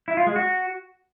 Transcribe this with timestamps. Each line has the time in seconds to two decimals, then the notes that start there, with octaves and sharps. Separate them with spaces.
0.08 E4
0.17 F4
0.26 G#3
0.36 F#4